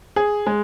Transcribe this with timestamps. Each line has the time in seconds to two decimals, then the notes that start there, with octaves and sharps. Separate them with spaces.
0.16 G#4
0.47 G#3